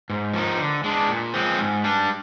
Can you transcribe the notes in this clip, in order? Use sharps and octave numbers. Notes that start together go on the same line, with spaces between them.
G#2
F3 A#3 D#4
D3
G#3 D4
A#2
F3 G#3 C4
G#2
G3 D4